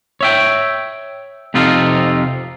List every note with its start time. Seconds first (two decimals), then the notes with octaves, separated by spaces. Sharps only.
0.21 C#5 E5 G5
1.54 F2 C3 D#4 F4 A4